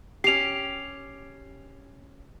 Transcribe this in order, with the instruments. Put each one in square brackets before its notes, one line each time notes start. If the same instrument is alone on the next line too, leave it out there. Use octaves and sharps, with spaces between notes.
[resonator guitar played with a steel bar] C#4 G4 [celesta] C7 F7